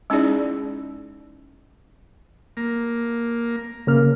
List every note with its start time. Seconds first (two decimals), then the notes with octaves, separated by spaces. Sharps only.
0.10 G#3 C#4 D#4 E4 G#4 D5
2.57 A#3
3.87 C#3 A#3 F6